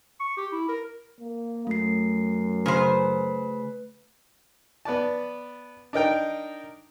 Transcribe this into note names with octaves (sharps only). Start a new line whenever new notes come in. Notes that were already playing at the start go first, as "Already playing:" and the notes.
C#6
G4
E4
A#4
A#3
F#2 A3 C7
C#3 B4 C5
B3 B4 D5 A5
D4 D#4 A#4 G5